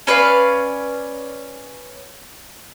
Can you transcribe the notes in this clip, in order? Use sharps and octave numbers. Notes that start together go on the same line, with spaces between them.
C#4 B4 D5 F5